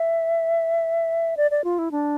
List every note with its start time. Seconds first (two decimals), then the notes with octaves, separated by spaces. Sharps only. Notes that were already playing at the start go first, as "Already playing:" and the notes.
Already playing: E5
1.37 D5
1.51 D5
1.64 F4
1.79 E4
1.92 D4